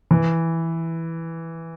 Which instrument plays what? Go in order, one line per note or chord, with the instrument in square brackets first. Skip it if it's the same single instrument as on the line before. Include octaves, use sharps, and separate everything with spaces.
[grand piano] E3